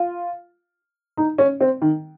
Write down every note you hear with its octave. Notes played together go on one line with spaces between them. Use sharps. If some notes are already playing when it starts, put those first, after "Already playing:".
Already playing: F4
D#4
C#4
C4
D#3